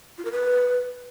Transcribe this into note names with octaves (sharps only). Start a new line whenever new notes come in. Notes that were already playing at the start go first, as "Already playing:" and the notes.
F4
A#4
B4